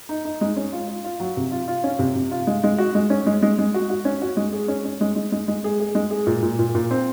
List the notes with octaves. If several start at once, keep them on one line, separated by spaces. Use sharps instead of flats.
D#4
D#4
G#3
C#4
F4
F4
F4
F#3
C3
F4
F4
C#4
C3
C3
F4
G#3
G#3
F#4
G#3
C#4
G#3
G#3
G#3
F#4
F#4
C#4
F#4
G#3
G#4
C#4
C#4
G#3
G#3
G#3
G#3
G#4
G#4
G#3
G#4
A#2
A#2
A#2
A#2
C4